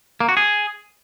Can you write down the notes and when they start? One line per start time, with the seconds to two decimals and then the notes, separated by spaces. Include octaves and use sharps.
0.20 A#3
0.29 F#4
0.37 G#4